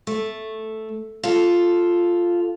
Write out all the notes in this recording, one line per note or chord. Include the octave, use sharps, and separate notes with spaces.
A3
F4 A4